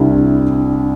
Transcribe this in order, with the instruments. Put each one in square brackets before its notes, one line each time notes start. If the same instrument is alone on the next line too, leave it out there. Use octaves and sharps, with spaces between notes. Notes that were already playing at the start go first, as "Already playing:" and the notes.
Already playing: [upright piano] C2 C3 G3 E4 [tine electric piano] D4